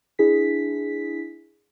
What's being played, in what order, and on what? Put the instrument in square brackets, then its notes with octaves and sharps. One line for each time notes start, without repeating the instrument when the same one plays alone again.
[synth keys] D4 E4 G#4 B6